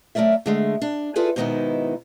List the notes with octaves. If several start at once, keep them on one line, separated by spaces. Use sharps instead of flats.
F#2 A3 A#4 D5 E5
D3 G#3 A3
D4
E4 F4 G#4 A4 B4 D5
G#2 B2 D#3 B3 D#4 E4